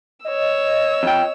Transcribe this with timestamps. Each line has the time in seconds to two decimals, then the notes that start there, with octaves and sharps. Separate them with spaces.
0.25 C#5 D#5 E6
1.03 F2 G5